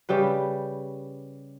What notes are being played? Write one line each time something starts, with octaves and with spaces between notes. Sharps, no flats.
C#3 G3 G4 B4